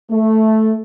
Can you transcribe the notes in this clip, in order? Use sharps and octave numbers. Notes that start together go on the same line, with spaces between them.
A3